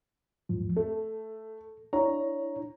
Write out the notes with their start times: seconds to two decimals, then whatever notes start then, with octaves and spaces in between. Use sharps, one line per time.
0.49 E2 G#2 F3
0.77 A3 A4
1.93 D4 E4 C#5 A#5